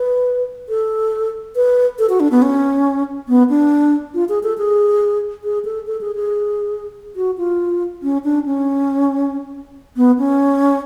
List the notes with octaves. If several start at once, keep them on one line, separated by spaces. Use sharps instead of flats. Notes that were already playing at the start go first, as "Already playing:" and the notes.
Already playing: B4
A4
B4
A4
F#4
D4
B3
C#4
B3
D4
F4
G#4
A4
G#4
G#4
A4
A4
G#4
G#4
F#4
F4
C#4
D4
C#4
B3
C#4